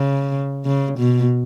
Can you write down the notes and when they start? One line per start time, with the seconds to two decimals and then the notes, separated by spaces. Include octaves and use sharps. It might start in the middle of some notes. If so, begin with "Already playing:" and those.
Already playing: C#3
0.65 C#3
0.99 B2